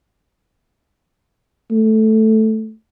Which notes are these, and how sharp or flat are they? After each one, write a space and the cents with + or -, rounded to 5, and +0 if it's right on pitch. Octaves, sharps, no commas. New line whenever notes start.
A3 -5